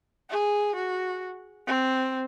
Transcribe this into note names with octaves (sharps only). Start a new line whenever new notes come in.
G#4
F#4
C4